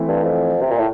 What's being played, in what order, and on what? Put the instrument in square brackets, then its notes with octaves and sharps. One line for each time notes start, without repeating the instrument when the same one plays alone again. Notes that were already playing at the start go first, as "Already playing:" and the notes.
Already playing: [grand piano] E3 A3 C4 E4
[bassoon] G2
F2
C3
A#2
A2